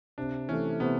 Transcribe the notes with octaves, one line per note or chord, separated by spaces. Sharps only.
C3 D4
E3 A3 C#4
C3 B3